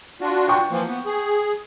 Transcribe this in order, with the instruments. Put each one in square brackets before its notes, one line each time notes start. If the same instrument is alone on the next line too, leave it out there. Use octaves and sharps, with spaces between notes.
[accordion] D4 F4 F#4
[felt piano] G5 C#6
[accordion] E3 F3 A#3
B3
G#4